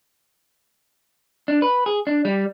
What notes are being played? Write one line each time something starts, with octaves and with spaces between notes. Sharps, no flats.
D4
B4
G#4
D4
G3